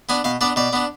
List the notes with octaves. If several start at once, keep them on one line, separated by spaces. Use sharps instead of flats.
B3 D4 G#5
B2 F5
B3 D4 D5
B2 D5
B3 D4